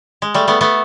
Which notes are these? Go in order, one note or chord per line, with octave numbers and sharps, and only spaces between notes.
G#3
G3 A3
A3 B3
A3 B3